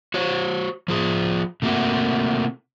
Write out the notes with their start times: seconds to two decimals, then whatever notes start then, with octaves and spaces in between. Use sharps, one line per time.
0.14 F#4 C5 C#5
0.88 F3 F4 G#4
1.62 C3 A3 A#3 F#4